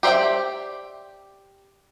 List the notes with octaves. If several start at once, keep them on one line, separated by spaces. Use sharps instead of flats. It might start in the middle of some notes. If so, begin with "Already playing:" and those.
G4 C5 D5 E5 G5